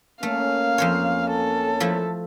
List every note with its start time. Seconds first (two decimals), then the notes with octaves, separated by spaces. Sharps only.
0.23 A3 A#3 C#4 F5
0.78 F2 C5 C#5
1.30 A4
1.80 F3 A3 E4